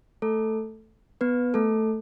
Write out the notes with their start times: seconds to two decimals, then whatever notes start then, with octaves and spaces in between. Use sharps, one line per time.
0.22 A3 A4
1.21 B3 B4
1.54 A3 A4